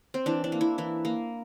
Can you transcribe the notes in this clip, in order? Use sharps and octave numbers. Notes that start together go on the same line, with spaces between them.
C4
E3 D4
D4
A#3
E4
E3 E4
A#3